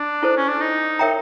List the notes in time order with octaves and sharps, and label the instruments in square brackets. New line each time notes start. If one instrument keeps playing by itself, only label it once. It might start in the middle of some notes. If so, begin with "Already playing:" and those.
Already playing: [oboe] D4
[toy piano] E4 A4 C5
[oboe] C#4
D4
D#4
[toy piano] A#4 C#5 E5 G5 A#5